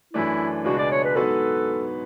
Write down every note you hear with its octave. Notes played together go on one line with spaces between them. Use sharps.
F#2 E3 A3 D4 E4
C#2 B2 G#3 D4 F#4 G#4
D5
C#5
B4
G#2 F#3 B3 F#4 A4 B4